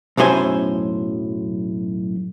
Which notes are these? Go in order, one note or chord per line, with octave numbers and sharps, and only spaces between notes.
B1 F#2 A2 C5 G#5